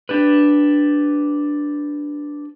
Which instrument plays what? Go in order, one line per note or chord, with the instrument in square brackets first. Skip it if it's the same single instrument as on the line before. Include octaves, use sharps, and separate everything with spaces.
[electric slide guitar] D4 G4 B4